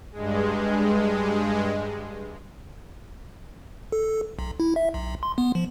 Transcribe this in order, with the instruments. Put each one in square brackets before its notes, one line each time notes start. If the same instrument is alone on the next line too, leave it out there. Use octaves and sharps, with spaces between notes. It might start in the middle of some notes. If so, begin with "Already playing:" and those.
[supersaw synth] G2 G#3
[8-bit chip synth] A4
B1
E4
E5
B1
C6
B3
F3